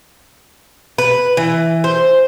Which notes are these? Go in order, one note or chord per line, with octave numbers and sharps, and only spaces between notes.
B4
E3
C5